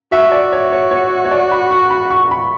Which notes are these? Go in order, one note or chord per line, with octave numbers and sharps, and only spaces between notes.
F#4 E5
D5
C#5
C#5
C#5
C#5
D5
B5
C#6
B5
C#6
B5